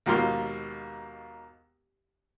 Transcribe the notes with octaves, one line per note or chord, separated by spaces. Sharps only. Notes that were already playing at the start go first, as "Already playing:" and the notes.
D#2 G#2 B2 A#3 C6 F6